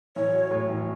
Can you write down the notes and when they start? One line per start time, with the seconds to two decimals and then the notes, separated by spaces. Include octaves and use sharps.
0.16 A1 C#5
0.34 F#3
0.51 A2
0.69 A1